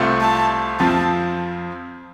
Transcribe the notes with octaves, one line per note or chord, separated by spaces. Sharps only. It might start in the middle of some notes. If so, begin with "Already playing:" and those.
Already playing: C2 C3 A3 C4 F4
A5
F2 F3 C4 F4 A5